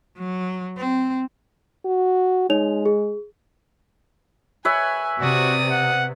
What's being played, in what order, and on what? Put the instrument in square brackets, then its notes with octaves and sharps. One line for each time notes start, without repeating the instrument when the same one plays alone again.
[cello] F#3
C4
[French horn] F#4
[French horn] G#3 [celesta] D#4 C#5 F7
[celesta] G#4
[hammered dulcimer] B4 C#5 E5 [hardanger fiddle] G#5
[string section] C3 [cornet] F#4 [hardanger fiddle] D5 D#6
[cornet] F#5